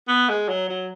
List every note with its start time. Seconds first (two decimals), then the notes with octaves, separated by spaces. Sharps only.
0.08 B3
0.29 G#3
0.49 F#3
0.69 F#3